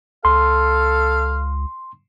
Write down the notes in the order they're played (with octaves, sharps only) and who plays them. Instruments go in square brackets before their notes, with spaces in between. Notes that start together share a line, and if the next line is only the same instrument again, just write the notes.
[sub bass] C#2 [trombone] A4 [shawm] F5 [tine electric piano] C6